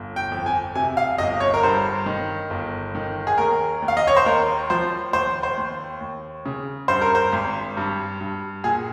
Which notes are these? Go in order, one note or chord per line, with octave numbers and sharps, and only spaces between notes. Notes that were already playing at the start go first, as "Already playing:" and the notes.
Already playing: G1
G5
F2
G#5
C3 G#5
F5
G1 D#5
C#5
A#4
G2 C5
D#3
G1
D#3
G#4
D#2 A#4
D#2
F5
D#5
C#5
C5
D#2 A#4
F3 C5
D#2 C5
C5
D#2
D#2
C#3
G2 C5
A#4
C5
G#1
G2
G2
A#2 G#4